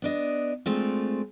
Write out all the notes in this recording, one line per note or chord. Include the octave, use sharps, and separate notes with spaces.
B3 D4 D#5
G#3 A3 C4 D4 F4